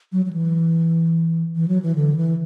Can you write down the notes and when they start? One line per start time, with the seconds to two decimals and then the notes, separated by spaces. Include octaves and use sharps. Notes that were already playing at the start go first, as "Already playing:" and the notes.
0.12 F#3
0.25 F#3
0.33 E3
1.55 E3
1.68 F#3
1.82 E3
1.95 D3
2.16 E3